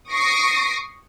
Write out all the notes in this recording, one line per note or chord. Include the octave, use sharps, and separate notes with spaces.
C#6 D#6 A#6 C7 D7